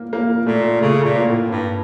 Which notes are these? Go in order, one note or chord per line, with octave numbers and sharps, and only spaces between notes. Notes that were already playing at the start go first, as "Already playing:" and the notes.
Already playing: A#3
A#3
A#2 A3
C#3 A3
A#2
A#3
A2
G2